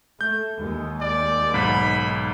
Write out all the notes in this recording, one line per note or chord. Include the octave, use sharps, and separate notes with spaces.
A3 G6
D#2 G#3
D5
B1 G#2 B5